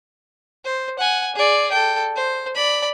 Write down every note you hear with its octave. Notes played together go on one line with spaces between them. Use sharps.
C5
F#5 G#5
G#4 D5
A4 G5
C5
D5 B5